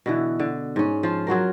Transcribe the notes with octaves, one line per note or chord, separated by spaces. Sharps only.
B2 D3 E3
D3
G#2 C#4
F3 F4
F#3 F4 F#4 A#4